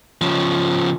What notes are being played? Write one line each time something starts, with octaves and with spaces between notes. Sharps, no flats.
C#3 F3